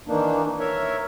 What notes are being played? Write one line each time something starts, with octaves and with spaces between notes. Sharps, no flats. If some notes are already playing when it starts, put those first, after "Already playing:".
D#3 E3 A#3 D4 D#4
A#4 C#5 E5